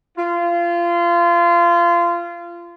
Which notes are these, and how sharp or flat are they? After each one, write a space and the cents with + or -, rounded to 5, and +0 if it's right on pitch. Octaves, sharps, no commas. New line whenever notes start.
F4 -25